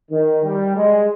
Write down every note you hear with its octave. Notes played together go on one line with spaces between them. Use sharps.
D#3
G3
G#3